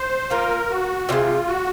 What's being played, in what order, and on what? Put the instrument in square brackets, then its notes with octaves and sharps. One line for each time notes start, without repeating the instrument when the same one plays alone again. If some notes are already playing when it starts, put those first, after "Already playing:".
Already playing: [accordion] C5
[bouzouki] F3 A#3 F4 [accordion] A#4
[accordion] F#4
[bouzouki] C3 D#3 G#3 [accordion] F4
[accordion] F#4